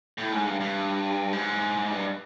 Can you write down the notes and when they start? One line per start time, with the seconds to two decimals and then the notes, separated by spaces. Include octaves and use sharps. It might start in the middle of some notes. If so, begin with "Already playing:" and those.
0.18 A2
0.32 G#2
0.46 G2
0.60 G2
1.33 G#2
1.91 G2